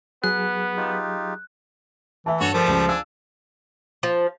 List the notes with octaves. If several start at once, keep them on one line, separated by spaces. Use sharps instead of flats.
F#3 B3 G#4 F#6
D#4 F4 G4
E3 E5 A5
G2 F#4 A4 C#5
F3 G3 A3 A#4
C#2
D4 F5 G#5 E6
F3